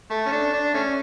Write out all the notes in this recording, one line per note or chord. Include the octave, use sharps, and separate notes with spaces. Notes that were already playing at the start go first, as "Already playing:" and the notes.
A3
C#4
D4
D4
A3 C#4